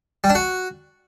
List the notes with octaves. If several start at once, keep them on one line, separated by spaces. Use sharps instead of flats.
G3
D4
F#4